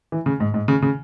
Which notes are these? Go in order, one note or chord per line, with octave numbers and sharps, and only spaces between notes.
E3
C#3
G#2
G#2
C#3
C#3